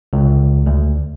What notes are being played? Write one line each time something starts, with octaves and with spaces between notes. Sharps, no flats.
C#2
D2